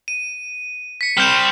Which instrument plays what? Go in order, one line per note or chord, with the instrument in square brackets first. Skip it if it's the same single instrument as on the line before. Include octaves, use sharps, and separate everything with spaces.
[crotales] D#7
B6 C#7
[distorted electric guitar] G3 C4 [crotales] F6 G6 E7